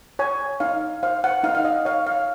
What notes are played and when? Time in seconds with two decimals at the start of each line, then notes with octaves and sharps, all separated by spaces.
0.19 C#5 G#5
0.60 D#4 F5
1.03 C5 F5
1.24 F#5
1.44 D#4 F5
1.55 F5
1.65 D#5
1.85 C#5 F5
2.07 F5